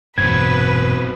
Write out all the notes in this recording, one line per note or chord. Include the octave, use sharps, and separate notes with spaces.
E1 G2 A#2 F#3 B3 C4 B4 G#6